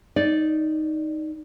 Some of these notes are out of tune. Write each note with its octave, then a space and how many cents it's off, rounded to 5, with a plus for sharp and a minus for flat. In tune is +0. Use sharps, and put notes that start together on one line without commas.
D#4 +0 D5 +0